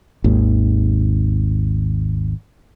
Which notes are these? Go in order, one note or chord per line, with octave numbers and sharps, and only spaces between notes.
G#1 D#2